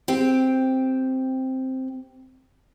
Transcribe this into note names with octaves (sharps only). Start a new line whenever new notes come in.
C4 G4 G5